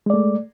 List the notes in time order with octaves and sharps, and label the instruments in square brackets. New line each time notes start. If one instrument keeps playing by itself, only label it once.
[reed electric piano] G#3
D5
A3